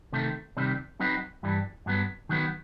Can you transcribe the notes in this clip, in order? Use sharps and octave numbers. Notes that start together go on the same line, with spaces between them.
C3 D#3 A3
C3 D#3 G3 C4
F#3 C4 D#4 F#4 B4
G2 E3 G3
G2 F#3 B3
D#3 F#3 B3